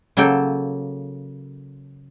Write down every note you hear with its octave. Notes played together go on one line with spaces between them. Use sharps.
C#3 F#3 A#3 A4 G5